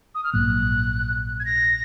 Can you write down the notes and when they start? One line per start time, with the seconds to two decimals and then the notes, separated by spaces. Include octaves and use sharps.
0.15 D#6
0.24 F6
0.33 A#1 G#2 F#3 A#3 F#6
1.40 G#6
1.45 A#6